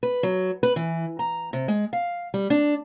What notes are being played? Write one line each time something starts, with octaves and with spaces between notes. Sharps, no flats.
B4
F#3
B4
E3
A#5
C3
G#3
F5
G3
D4